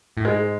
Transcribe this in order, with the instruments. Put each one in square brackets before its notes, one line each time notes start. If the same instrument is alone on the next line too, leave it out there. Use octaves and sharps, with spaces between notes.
[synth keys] A2
[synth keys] G#2 [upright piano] G#3